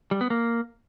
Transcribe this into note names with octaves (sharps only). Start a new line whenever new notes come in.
G3
B3
A#3